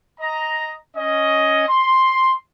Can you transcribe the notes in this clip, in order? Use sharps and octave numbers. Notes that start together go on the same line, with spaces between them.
D#5 A#5
C#4 D#5
C6